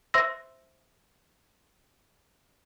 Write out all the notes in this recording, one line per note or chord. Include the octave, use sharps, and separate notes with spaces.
C5 E5 C6 E6 A#6